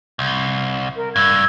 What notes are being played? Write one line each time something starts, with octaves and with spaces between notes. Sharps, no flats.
C2
A#4
G2 E6 G#6